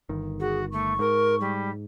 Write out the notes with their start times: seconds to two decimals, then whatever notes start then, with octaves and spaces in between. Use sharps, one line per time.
0.09 G1 D#3
0.39 F#4 G#4
0.72 A3 C#6
0.99 G#2 A#4
1.40 G3